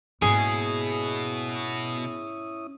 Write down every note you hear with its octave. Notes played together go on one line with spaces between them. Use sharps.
G#2 B2 A#3 C#4 E4 G#4 D#6